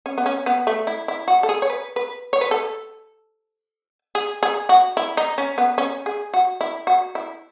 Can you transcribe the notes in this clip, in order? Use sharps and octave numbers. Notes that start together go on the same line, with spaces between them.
C#4
B3
C#4
B3
A3
E4
E4
F#4
A4
G#4
C#5
B4
B4
C#5
B4
A4
G#4
G#4
F#4
E4
D#4
C#4
B3
C#4
G#4
F#4
E4
F#4
E4